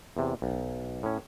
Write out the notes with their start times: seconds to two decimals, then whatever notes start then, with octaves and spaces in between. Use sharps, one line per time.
0.17 E2 C3
0.42 B1
1.03 A2 C#4